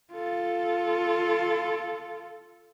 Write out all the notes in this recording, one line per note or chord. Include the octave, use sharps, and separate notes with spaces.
F4 A4